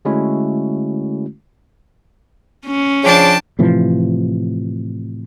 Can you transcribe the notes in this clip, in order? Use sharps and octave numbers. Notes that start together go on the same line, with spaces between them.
D3 G#3 A3 C#4 E4 F#4
C#4
C#3 F3 D4 G5 A5
A2 C3 E3 F3